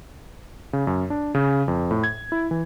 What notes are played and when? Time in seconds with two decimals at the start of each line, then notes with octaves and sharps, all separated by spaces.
0.73 C#3
0.87 F#2
1.10 D4
1.35 C#3
1.68 F2
1.91 A2
2.04 G#6
2.32 E4
2.51 E3